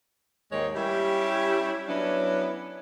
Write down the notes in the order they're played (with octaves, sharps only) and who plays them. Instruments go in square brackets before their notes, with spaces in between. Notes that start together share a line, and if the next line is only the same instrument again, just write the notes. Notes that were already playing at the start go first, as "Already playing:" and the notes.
[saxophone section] D#2 G#2 D#3 G#3 C#5
G3 C#4 E4 G4
F#3 B3 C#4 D4 E4